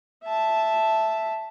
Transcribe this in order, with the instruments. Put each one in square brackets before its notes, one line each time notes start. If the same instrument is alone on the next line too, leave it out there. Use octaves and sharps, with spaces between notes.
[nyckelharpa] E5 A5